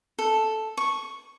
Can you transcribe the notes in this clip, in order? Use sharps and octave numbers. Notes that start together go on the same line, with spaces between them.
A4
C#6